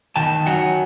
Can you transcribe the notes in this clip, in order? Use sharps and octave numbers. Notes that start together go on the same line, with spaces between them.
D#3 G5 A5
F#3 F#5 G#5